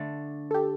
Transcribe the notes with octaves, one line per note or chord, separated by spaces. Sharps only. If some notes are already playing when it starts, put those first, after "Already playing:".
Already playing: D3 A3 D4
A4
G4